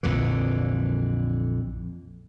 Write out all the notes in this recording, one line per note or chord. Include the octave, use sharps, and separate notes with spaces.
A#1 F2 D3 E3